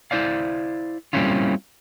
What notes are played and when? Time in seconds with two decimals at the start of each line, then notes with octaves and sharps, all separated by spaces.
0.11 E4 C5 D5 F5
1.13 G3 A#3 C4 C#4 E4 F4